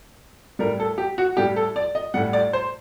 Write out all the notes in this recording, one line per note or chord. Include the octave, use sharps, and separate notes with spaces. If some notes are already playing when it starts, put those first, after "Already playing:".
A2 G3 A#4
A4
G4
F#4
A2 G3 G4
A4
D5
D#5
A2 G3 F#5
D5
C5